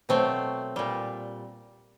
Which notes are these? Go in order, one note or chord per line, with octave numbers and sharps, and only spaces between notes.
B2 F#3 A3 C4
A#2 G3